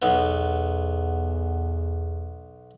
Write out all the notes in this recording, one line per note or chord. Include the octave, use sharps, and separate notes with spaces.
B1 E2 B3